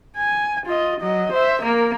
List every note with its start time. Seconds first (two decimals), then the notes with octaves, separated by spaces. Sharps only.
0.17 G#5
0.66 F4 D#5
1.01 F#3 D#5
1.32 C5 E5
1.62 A#3 A#4